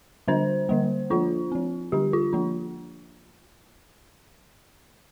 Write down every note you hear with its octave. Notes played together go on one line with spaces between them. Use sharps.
D3 G3 D4 C5
D3 G3 A#3
F3 A#3 D4 F4
F3 C4
D3 G3 D4 G4
F4
F3 A#3 D4